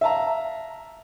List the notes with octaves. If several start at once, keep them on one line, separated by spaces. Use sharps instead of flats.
E5 F5 A5 A#5